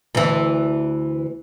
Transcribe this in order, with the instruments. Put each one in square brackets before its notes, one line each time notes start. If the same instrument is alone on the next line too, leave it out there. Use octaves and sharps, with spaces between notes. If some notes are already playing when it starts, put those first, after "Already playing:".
[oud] D2 E3